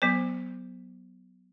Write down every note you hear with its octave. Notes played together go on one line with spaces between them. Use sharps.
F#3 B3 C5